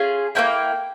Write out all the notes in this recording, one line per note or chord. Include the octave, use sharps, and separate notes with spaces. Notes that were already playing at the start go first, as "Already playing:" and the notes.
Already playing: C#4 F4 G#4
A#3 C#4 E4 G5